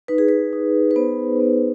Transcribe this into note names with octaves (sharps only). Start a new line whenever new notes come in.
D#4 B4
G#4
B4
D#4
B4
B3 C5
B3